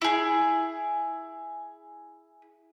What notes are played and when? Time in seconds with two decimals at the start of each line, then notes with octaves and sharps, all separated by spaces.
0.02 E4 G#4